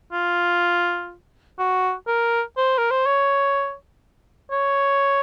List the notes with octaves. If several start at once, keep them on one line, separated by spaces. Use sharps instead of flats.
F4
F#4
A#4
C5
A#4
C5
C#5
C#5